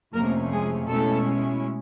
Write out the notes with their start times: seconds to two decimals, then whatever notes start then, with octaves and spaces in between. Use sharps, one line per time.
0.14 F2 C3 F3 A3 A#3 C#4 A#4
0.52 G#3 G#4
0.89 B2 G#3 A3 C#4 E4 A4